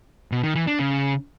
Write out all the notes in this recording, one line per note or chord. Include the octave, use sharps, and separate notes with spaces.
B2
D#3
E3
D4
C#3